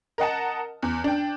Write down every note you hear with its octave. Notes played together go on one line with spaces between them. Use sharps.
A#4 D#5 F#5 A5
E2
D4 G5